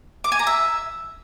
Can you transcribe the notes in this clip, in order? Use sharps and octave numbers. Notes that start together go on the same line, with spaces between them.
D6
G#5
A#5
E5